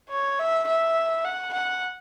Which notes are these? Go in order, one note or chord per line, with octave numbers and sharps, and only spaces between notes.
C#5
E5
E5
F#5
F#5